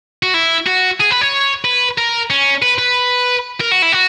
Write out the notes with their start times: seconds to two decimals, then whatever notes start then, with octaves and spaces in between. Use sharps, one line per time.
0.23 F#4
0.34 E4
0.66 F#4
1.00 G#4
1.11 B4
1.21 C#5
1.64 B4
1.98 A#4
2.30 C#4
2.62 B4
2.79 B4
3.60 A#4
3.71 F#4
3.82 E4
3.92 F#4